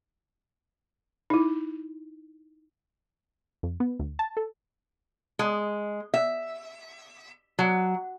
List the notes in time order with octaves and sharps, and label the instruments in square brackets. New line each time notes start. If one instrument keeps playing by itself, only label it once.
[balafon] D#4 E4
[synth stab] F2
B3
D2
A5
A4
[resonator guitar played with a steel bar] G#3
E5
F#3